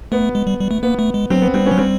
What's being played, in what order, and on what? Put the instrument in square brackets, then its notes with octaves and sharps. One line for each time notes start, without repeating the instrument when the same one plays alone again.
[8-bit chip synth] A3 [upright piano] B3
[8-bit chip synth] G#3
G3
G3
A3
[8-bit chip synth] A#3 [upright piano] B3
[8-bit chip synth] A3
G#3
[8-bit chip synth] F#3 [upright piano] C4
[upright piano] B3
[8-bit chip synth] G3 [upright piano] C4
[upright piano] B3 C#4
[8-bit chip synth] F#3
[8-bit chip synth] G3 [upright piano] C4